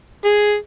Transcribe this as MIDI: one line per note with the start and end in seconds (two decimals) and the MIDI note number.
0.25 0.55 68